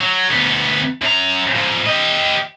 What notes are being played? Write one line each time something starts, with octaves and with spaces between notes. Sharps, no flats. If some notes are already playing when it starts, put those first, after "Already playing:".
F#3
D2 B3
F#2 A#5
G#2 F3
G4 D#5